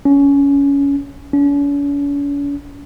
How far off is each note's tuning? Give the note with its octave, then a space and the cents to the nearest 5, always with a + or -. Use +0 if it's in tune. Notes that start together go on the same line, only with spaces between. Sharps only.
C#4 +20
C#4 +45